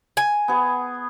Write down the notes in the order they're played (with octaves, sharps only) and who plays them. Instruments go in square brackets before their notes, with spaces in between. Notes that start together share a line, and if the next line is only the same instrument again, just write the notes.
[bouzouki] G#5
[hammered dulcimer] B3 G#4